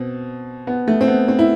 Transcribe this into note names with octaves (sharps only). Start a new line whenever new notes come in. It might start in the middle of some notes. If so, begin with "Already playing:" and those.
Already playing: B2 C4
B3
A3
C4
B3
C4
E4